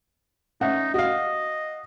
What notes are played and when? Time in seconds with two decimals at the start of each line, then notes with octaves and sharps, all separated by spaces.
0.61 C#4 D#4 E5 F#5
0.94 F#4 D#5 F5